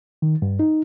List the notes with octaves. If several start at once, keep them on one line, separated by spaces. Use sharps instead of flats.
D#3
G2
D#4